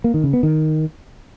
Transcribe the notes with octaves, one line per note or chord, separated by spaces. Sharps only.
A#3
D#3
C#3
B3
D#3